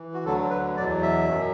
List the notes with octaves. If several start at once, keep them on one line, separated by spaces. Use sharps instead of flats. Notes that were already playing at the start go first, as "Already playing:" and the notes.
Already playing: E3
F#4
D2 D3 F#3 A4
B4
E2 B2 F#3 D5
E5
F#2 F#3